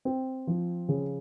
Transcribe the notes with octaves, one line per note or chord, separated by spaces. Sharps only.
C4
F3
C#3